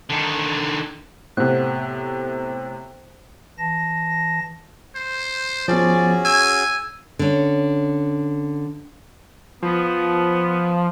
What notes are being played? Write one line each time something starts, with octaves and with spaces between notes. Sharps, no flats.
D3 D#3
A2 C3 B3 C5 F#6
E3 A5 A#6
C5
F3 B3 C#4 F#4 G#4 D5
G#5 E6
D3 C#4
F3 B3